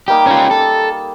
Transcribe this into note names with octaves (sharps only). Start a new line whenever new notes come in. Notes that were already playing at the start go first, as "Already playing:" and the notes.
G3 A#3 D#4 G4
C#4 F4
A4